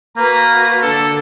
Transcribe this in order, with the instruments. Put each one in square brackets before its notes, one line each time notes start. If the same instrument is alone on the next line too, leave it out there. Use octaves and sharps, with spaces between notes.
[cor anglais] A#3 [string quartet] F#4 B4 A#6 [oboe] A#5
[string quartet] D3 D4 [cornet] A4